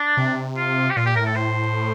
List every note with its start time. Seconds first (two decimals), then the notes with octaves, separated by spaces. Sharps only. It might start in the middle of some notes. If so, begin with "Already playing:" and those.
Already playing: D4
0.17 C3
0.57 F4
0.90 G4
0.97 A#2 F4
1.06 G4
1.16 A2 A#4
1.26 A4
1.36 C5